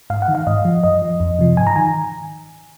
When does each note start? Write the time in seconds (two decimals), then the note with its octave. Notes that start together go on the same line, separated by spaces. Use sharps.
0.10 G#2 F5
0.22 F#5
0.28 D#3
0.35 F5
0.47 G#2 D#5
0.65 F3
0.84 F#2 D#5
1.02 F3
1.20 F2
1.39 C3 F3
1.57 G#2 G#5
1.67 A#5
1.76 D#3 G#5